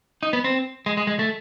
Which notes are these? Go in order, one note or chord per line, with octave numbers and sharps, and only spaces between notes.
D#4
B3
C4
G#3
G#3
G#3
A3